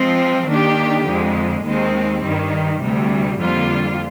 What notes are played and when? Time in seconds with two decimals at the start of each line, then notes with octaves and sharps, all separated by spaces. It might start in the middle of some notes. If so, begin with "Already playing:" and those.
Already playing: F3 G#3 C4
0.48 D#3 A#3 D4 G4
1.06 F2 D3 G#3
1.64 D#2 D#3 G#3 C4
2.22 G2 D#3 G3
2.80 D2 C3 G3
3.39 F2 D3 G3 A#3 F4